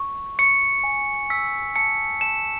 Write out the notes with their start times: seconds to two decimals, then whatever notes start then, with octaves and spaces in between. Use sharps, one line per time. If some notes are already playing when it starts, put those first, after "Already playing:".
Already playing: C#6
0.39 C#6 C#7
0.84 G#5
1.30 E6 B6
1.76 A5 C#7
2.21 A5 E7